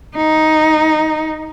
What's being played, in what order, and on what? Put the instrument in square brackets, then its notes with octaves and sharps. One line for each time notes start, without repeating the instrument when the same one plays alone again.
[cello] D#4